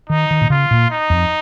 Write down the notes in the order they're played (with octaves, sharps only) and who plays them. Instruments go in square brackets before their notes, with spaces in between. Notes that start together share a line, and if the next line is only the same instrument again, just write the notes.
[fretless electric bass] D#3 [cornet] D#4
[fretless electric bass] D#3
A#2
[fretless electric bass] C#3 [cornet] F4
[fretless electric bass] A#2
[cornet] D#4
[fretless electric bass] F2